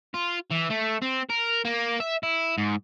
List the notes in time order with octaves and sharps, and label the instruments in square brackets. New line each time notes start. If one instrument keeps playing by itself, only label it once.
[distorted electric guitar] F4
E3
A3
C4
A#4
A#3
E5
E4
G#2